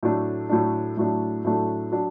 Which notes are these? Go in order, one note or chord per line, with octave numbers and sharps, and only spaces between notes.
A2 F#3 A3 D4
A2 F#3 A3 D4
A2 F#3 A3 D4
A2 F#3 A3 D4
F#3 D4